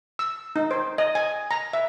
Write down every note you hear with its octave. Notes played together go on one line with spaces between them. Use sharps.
E6
D#4
C5
D#5
G#5
A#5
E5